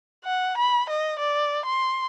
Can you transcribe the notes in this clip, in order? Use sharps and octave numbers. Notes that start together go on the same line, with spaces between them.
F#5
B5
D#5
D5
C6